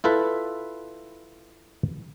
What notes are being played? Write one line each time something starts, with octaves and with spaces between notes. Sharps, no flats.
E4 F4 A4 B4 E5